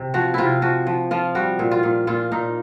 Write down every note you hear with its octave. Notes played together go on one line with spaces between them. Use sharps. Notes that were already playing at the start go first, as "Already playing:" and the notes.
Already playing: C3
F3 F#4
C3 E4 F4
F3 F#4
F3
F3 F4
G3 F#4
A#2
F4
A#2
A#2 F4
A#2 D#4